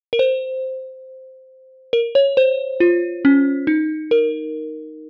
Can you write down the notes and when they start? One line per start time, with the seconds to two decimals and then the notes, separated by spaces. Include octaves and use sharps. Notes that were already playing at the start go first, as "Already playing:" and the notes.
0.13 A#4
0.19 C5
1.93 A#4
2.15 C#5
2.37 C5
2.80 F4
3.25 C#4
3.67 D#4
4.11 A#4